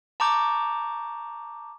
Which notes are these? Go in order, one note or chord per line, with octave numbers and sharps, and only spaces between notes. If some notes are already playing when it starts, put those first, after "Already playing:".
A5 A#5 C#6 D6 G6